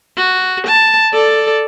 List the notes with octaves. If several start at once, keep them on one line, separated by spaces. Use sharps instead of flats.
F#4
A5
A4 D5